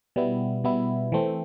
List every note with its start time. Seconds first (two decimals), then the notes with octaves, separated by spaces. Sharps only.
0.16 B2 G3 B3 E4
0.64 B2 G3 B3 E4
1.12 E3 A3 C4